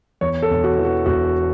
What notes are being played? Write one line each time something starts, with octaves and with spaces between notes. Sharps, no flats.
E2 C#5
A4
E1
F#4
E3
F#4
E1 F#4